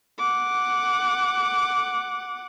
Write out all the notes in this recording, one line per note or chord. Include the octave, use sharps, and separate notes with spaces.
F#5 D6